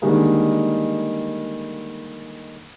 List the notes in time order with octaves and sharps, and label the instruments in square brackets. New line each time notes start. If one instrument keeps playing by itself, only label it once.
[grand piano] D3 D#3 G3 G#3 A#3